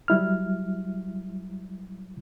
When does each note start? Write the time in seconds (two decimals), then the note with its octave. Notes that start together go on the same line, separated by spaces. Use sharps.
0.08 F#3 G3 E4 F6